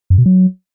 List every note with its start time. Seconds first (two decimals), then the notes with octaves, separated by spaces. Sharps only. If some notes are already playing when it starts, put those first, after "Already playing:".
0.10 F#2
0.18 B2
0.26 F#3